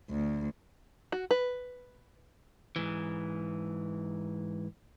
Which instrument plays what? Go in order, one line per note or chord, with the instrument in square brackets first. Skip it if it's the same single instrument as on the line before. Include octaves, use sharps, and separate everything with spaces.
[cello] D2
[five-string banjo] F#4
B4
[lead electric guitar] G#2 E3